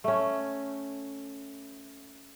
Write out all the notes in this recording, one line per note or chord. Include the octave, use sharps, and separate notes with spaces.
A3 C#4